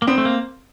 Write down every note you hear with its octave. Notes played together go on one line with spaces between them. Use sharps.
A#3
B3 C4
A3
A#3